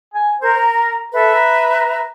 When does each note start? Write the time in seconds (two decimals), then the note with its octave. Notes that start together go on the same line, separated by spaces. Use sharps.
0.14 G#5
0.41 A#4 C5
0.57 A#5
1.13 A4 B4 E5
1.35 A#5